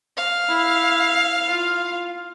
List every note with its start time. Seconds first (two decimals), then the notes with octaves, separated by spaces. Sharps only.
0.17 F5
0.49 E4
1.48 F4